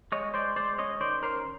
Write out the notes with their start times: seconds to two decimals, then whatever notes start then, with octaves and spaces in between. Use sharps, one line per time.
0.12 G#3 C#5 D#5
0.34 G#3 C5 D5
0.56 G#3 C5 D5
0.78 C#4 C#5 D#5
1.00 D#3 C5 D5
1.23 C#4 A#4 C5